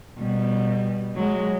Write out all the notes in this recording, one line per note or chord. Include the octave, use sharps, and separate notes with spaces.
B2 G3
F#3 G#3